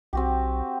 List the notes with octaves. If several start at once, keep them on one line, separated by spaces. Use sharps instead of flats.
B1 C4 F#4 G4